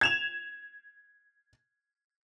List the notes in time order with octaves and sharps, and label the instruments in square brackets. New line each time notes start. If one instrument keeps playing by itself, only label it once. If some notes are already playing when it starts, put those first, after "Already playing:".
[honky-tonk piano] G#6 E7 F7